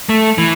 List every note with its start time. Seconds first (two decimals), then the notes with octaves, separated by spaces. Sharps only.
0.09 A3
0.38 E3